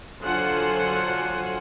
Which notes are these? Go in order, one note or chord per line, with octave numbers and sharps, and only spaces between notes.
D3 F#3 F4 C5 F#5 G#5